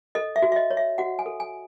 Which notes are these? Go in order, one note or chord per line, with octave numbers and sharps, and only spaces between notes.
A4 D#5
E5
F#4
E5
D#5
C#5
E5
F#4 F#5
G#5
A4
G#5